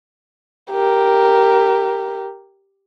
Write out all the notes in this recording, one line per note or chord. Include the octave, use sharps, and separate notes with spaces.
G4 A#4